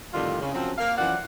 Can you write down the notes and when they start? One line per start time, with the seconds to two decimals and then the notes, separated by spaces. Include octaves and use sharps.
0.14 F2 A2 D3 D#3 G3 F4
0.41 C#3
0.54 F#2 F3 F#3 C4
0.78 A#3 F5
0.98 F#2 E3 F3 D5 F#5